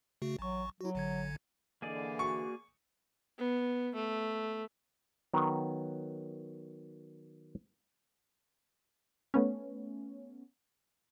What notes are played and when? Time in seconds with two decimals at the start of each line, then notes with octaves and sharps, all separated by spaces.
0.22 C#3 A3 F#4
0.39 A1 F#3 C#6
0.81 F#3 E4 F#4
0.95 A1 D3 G#6
1.82 D3 E3 A#3 G#4 D5 D#5
2.19 F#4 C#6
3.38 B3
3.95 A3
5.34 D#3 F#3 B3
9.34 A3 B3 C#4